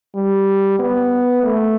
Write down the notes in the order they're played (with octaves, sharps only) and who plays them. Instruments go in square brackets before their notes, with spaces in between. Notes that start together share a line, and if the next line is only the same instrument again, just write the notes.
[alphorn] G3
B3
A3